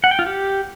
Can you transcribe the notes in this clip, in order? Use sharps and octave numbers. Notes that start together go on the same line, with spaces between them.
F#5
G5
F4
G4